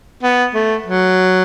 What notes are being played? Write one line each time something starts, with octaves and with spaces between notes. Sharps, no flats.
B3
A3
F#3